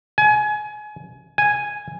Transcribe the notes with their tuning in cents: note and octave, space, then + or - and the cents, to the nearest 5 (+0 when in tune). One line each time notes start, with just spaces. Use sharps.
G#5 +25
G#5 -5